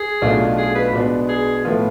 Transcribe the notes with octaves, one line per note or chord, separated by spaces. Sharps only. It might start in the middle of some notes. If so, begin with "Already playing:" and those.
Already playing: G#4
B1 B2 A3 D4 F4
G#4
B4
B2 G#3 B3 D4
G#4
A2 F3 B3 F4